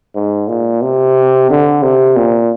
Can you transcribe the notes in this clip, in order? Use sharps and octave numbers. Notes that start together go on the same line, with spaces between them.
G#2
A#2
C3
D3
C3
A#2